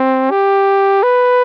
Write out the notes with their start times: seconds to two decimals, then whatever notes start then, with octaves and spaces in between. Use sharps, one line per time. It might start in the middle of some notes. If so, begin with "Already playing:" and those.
Already playing: C4
0.31 G4
1.03 B4